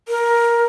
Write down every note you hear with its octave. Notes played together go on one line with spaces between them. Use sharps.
A#4